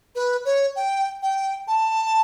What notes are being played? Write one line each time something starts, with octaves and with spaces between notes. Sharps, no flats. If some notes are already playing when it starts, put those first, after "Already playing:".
B4
C#5
G5
G5
A5